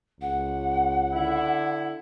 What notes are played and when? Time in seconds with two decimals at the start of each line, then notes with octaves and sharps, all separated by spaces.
0.21 C#2 F#5
1.13 D3 E4